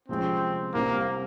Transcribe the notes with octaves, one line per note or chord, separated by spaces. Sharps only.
C3 F3 G#3 C4 C#4
C2 C3 G3 A#3 C4